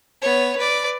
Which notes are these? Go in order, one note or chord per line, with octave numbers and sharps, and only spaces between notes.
B3 C#5
B4 D5